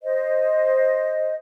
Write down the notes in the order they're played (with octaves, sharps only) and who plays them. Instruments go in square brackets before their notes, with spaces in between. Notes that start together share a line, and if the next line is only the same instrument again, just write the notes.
[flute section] C5 D#5